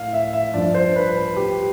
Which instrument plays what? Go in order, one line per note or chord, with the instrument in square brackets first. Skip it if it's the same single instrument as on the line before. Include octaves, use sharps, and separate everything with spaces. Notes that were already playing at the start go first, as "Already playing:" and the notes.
Already playing: [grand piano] A2 F5
E5
E5
G2 F3 D5
C5
B4
B4
G4